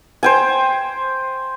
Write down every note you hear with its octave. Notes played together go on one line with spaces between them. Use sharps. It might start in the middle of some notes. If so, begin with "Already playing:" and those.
C5 G5 G#5